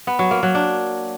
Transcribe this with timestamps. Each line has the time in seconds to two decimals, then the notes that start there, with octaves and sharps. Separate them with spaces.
0.07 B3
0.19 F#3
0.31 A#3
0.43 F#3
0.55 D4